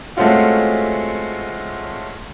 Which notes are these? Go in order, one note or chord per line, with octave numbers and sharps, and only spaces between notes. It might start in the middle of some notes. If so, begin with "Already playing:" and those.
G#3 A3 C4 C#4 F4 F#4